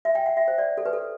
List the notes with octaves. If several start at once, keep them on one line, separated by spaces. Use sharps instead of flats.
E5
G5
F#5
E5
C5
D5
A4
B4
A4